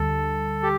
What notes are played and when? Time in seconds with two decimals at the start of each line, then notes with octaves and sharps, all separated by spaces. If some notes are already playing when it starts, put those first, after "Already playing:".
Already playing: D2 D3 G3 A4
0.63 G4